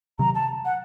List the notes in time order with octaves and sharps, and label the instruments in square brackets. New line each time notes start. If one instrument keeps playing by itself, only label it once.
[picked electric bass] C3 D#3 F#3 [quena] A#5
[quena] A5
F#5